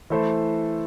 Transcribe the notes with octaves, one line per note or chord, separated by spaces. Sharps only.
E3 A3 E4 A4 C5